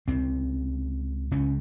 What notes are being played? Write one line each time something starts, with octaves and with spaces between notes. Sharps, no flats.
C#2 C3 C4
C#2 C#3 C#4